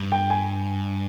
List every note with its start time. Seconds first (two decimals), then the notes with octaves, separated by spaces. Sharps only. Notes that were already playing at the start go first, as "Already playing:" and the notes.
Already playing: G2
0.12 G5
0.30 G#5